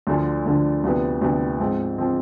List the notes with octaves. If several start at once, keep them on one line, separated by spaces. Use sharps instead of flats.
D2 D3 F3
D2 D3 F3
D2 C3 F3 B3
D2 C3 F3 B3
G#2 F3 C4
F3 C4